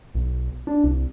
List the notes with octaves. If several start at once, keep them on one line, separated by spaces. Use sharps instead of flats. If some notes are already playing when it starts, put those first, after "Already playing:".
B1
D4
C2